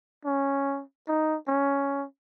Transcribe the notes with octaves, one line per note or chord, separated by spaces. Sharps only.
C#4
D#4
C#4